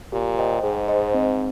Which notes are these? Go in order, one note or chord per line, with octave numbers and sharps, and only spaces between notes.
A#2 G4
C5 D#5 G5
G#2 G#4
C5 D#5
C4